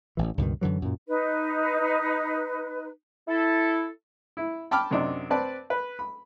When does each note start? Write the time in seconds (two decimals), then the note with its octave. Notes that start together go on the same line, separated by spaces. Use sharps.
0.17 A1 E3
0.38 C#2 G2 B2 D#3
0.61 F#2 D3 E3 F#3
0.82 F#2 A#2
1.08 D#4 B4
3.28 E4 A4
4.37 E4
4.71 G5 A5 B5 D6 F6
4.91 F#2 C3 D4 D#4
5.30 C4 B4 D5 A5
5.70 B4
5.99 B5